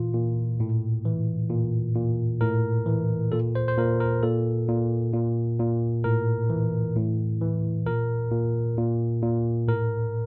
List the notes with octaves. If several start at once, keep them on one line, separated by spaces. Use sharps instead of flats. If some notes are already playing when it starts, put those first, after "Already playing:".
Already playing: A#2 E3 F4
A#2
A2
E3
A#2
A#2
A2 A#4
E3
A#2 A4
C5
C5
A#2 A#4
A#4
A#2 A4
A#2
A#2
A#2
A2 A#4
E3
A2
E3
A#2 A#4
A#2
A#2
A#2
A2 A#4